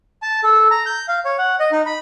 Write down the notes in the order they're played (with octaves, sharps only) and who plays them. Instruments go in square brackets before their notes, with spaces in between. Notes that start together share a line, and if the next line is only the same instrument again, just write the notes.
[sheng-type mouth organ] A5
A4
A#5
G6
F5
C#5
F#5
D#5
D#4
B5